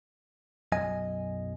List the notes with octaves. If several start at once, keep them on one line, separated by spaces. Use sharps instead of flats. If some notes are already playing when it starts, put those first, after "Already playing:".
B1 F#2 D#5 G#5